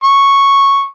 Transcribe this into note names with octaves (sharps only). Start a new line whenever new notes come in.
C#6